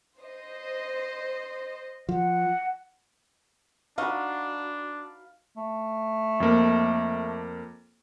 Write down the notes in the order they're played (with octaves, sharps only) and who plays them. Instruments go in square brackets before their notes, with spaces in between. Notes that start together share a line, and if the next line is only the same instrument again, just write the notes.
[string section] C5 D#5
[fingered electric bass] F3 [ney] F#5
[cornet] D4 [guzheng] D#4 F#4 [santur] F5 B5
[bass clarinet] A3
[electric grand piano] F2 A#3